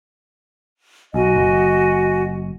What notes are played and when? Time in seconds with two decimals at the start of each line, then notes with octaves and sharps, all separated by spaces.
1.14 B1 F#4 D#5 G#5
1.36 F#1